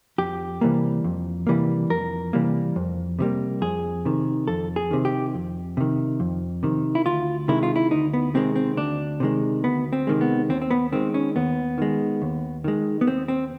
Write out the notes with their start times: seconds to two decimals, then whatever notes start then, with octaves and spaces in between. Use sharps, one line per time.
0.18 F2 G4
0.61 C3 E3 G3 A#3
1.04 F2
1.47 C3 E3 G3 A#3
1.90 F2 A#4
2.33 C3 E3 G3 A#3
2.76 F2
3.19 C3 E3 G3 A#3
3.62 F2 G#4
4.05 C3 D#3
4.48 F2 A4
4.76 G#4
4.91 C3 D#3
5.05 G4
5.34 F2
5.77 C3 D#3
6.20 F2
6.63 C3 D#3
6.95 E4
7.05 D2 F4
7.48 C3 D#3 G#3 E4
7.63 F4
7.76 E4
7.91 D2 D#4
8.14 B3
8.34 C3 D#3 G#3 C4
8.56 C4
8.77 D2 D4
9.20 C3 D#3 G#3
9.63 D2 B3
9.93 C4
10.07 C3 D#3 G#3
10.21 B3
10.49 D#2 C4
10.62 C4
10.71 B3
10.92 D#3 G#3 C4
11.14 C#4
11.36 D#2 B3
11.78 D#3 G#3
12.22 D#2
12.64 D#3 G#3
13.01 B3
13.07 D#2 C4
13.28 C4